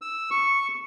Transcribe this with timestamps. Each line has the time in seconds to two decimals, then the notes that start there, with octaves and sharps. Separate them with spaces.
0.02 E6
0.31 C#6